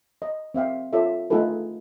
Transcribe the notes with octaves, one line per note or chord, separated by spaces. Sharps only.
D#5
C4 E5 F5 G5
F4 A4 C#5 D5 E5
A3 D#4 F4 G#4 A4 B4